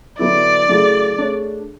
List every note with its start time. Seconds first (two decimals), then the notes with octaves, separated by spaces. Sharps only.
0.19 D3 F#3 B3 E4 D5
0.68 C#3 F#3 A3 E4 G#4
1.18 A3 D4 G#4 C#5